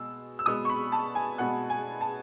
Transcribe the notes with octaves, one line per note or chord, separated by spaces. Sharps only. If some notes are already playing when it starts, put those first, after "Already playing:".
Already playing: B2 G#3 B3 E6
E6
B2 G#3 B3 D#6
C#6
B5
A5
G#5
B2 G#3 B3 F#5
G#5
A5